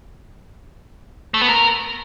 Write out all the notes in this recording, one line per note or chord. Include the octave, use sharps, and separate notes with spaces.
A3
B3
A#4